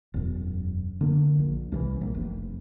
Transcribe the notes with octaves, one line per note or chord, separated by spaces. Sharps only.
E1 F#2
D3 A#3
A#1
C2 D#3 E3
A#1
F1